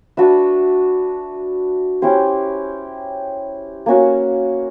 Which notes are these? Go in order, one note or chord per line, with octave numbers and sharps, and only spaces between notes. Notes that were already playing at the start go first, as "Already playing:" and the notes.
D4 F#4 B4 E5
C#4 E4 G4 C5
A#3 C#4 F#4